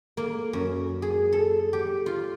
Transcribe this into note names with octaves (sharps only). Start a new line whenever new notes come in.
A#3
F#2
G#4
A4
G4
F4